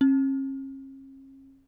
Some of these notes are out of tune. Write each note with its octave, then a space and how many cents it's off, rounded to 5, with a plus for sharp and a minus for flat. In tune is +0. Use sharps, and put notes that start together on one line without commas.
C#4 -45